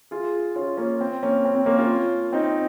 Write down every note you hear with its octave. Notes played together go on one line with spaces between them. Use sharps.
F4 G#4
C#4 F4
A#3 C#4
C4
A#3 C#4
C4
C4
A#3 C#4
C#4 F4
C4 D#4